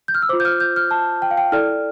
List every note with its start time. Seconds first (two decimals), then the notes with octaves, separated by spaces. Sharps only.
0.08 G6
0.15 F6
0.22 E6
0.29 F4 C5 D6
0.40 G6
0.45 F6
0.60 G6
0.76 F6
0.91 A5
1.22 G5
1.31 F5
1.38 G5
1.52 E4 A4 D5 F6